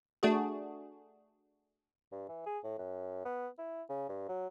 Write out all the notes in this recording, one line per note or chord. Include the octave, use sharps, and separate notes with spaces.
A3 D4 F#4 G#4
G2
E3
G#4
A2
F#2
B3
E4
C#3
G2
F#3